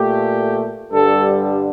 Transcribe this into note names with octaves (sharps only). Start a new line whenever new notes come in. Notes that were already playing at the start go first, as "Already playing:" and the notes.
Already playing: A#2 A3 G4
G2 D3 G3 A4